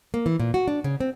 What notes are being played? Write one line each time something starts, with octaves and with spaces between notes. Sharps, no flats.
A#3
E3
A#2
F#4
D4
C#3
C4